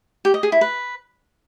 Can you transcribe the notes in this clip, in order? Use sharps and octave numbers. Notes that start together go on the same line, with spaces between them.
G4
D#5
G#4
E4
B4